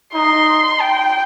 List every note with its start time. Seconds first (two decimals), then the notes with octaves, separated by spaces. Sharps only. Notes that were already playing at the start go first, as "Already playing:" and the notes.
0.13 D#4 C6
0.81 G5